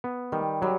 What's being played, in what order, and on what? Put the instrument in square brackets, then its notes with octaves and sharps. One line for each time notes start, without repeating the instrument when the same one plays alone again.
[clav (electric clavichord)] B3
[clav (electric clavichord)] D#3 [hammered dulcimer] G3
[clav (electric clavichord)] F#3 [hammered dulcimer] G3